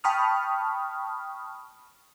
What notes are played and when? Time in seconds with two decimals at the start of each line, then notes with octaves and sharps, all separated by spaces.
0.04 G5 A5 B5 C#6 D#6 F6